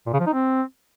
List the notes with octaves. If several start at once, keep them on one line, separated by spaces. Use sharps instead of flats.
A#2
C#3
F3
D#4
C4